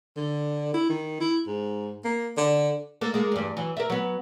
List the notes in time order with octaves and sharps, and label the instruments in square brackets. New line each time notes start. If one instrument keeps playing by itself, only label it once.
[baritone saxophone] D3
E4
D#3
E4
G#2
A#3
D3
[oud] A#3 A4
G#3 A#3
E2 G2
E3 F#3
A#4 E5
F#3 B3